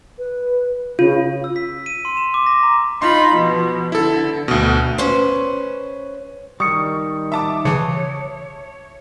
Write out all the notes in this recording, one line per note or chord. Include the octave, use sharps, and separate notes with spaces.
B4
C#3 F4
E6
B6
D#7
C6
E7
D6
A#6
A#5
D#4 F4 B5 C6
B2 F3
D3 E4 A4
D2 B2
C#4 B4 C5
D#3 G3 C#6 D#6 C#7
E5 A5 D6
C#3 E3 C#5